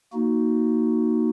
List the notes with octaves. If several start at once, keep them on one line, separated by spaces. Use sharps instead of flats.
A#3 D#4 F#4